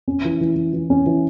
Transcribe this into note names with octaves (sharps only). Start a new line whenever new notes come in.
C#4
E3
E3
E3
E3
C#4
E3